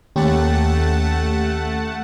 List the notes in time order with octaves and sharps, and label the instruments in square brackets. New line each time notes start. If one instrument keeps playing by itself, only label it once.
[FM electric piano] D#2 C#4 G4 [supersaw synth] A3 F#5 A5